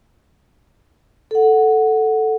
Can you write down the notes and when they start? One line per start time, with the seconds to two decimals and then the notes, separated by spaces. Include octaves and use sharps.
1.31 A4 F#5